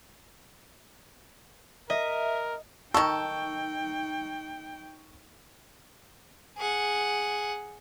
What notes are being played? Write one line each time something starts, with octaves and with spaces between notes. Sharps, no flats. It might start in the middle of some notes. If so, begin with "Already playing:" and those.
A#4 D#5 E5
D#3 D#4 A4 G5 C#6
G#4 F#5